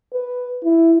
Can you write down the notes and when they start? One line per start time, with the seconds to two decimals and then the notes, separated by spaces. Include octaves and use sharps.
0.14 B4
0.64 E4